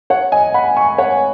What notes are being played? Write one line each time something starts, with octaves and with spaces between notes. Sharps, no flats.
C#5 F#5
D#5 G#5
F#5 B5
G#5 C#6
C#5 F#5